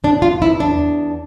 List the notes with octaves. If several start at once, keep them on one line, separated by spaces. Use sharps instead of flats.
E2 D4
F4
E2 E4
D4
E2